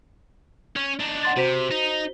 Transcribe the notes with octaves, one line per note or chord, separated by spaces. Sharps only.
C#4
D4 D#4
F#5 C6 A6
C3 F#4 C5 B6
D#4